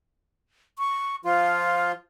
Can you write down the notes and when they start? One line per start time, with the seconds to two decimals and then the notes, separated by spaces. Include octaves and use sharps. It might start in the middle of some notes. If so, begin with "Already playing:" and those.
0.79 C#6
1.25 F3 F4 F5